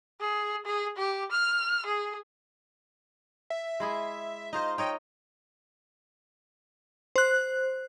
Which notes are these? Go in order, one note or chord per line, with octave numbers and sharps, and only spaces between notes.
G#4
G#4
G4
F6
G#4
E5
G#3 E4 G#4
D#4 F4 C5 D#5
D#4 C#5 D#5 G5
C5 F#6